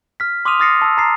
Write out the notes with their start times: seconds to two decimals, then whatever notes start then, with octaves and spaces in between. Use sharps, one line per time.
0.20 F6 B6
0.45 C6 D6 D#6 F6 D#7 F7
0.60 D#6 F6 A6 A#6 C7 C#7
0.82 A5 E6
0.98 A#5 A6 C7